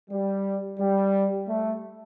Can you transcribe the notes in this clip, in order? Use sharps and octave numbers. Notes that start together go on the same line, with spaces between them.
G3
G3
A3